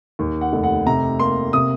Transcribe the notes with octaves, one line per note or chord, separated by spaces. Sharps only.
D#2
F#5
F1
F#5
C3 A#5
A#3 C6
C3 D#6